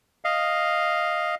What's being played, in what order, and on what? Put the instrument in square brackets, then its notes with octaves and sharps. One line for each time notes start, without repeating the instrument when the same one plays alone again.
[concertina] D#5 F5